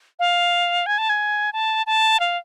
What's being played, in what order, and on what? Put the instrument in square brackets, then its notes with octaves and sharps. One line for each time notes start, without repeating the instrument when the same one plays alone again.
[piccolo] F5
G#5
A5
G#5
A5
A5
F5